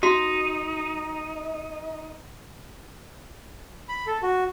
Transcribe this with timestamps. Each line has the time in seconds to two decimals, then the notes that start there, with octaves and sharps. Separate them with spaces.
0.03 D#4 F#4 C6
3.89 B5
4.07 A4
4.23 F#4